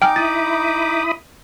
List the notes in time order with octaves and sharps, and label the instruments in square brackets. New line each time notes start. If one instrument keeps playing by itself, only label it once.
[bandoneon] D#4 D6 [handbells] G5 G#5 F6
[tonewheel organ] E4 B5 D#6 [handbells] A6